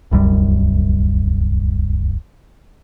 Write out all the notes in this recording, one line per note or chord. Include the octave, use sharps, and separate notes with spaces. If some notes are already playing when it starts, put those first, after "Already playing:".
D1 C2 F#2 G3